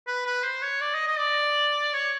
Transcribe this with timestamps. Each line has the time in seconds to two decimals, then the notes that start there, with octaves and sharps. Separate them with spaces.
0.07 B4
0.26 B4
0.44 C5
0.63 C#5
0.81 D5
0.94 D#5
1.07 D#5
1.19 D5
1.94 C#5